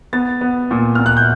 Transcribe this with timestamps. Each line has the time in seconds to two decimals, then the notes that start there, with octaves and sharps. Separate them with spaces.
0.13 B3 A6
0.41 B3
0.71 A#2
0.95 A#2 F6
1.06 F#6
1.17 G6